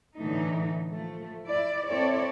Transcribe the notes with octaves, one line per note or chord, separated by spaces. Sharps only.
A2 D3 E3 A3 D#4
F3 A3
E4 D5
C4 E4 A4 C#5 D5